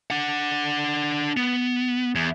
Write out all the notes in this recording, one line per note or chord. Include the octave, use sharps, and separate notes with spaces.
D4 F#5
B3
E2